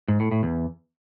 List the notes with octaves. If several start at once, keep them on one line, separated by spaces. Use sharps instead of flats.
G#2
A2
A2
E2